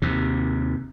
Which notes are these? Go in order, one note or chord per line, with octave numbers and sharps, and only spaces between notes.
D#2 C3